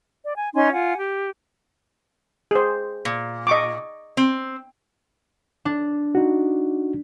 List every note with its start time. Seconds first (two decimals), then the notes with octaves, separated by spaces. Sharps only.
0.24 D5
0.37 G#5
0.54 C#4 D#4 G#5 C6
0.71 F4 F#5 G#5
0.97 G4
2.51 G#4 C5
3.05 A#2
3.47 D#5 C#6 D6
4.17 C4
5.65 D4
6.15 D#4 F#4